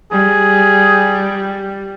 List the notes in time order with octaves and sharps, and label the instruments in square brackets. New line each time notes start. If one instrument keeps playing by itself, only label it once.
[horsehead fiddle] G3 [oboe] G#4